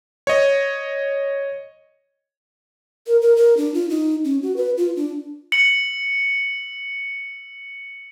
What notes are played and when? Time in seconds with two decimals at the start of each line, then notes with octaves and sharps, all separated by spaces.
0.27 C#5 D#5
3.07 A#4
3.22 A#4
3.36 A#4
3.57 D4
3.74 F4
3.90 D#4
4.24 C#4
4.43 F#4
4.56 B4
4.77 F4
4.96 D4
5.52 C#7 F#7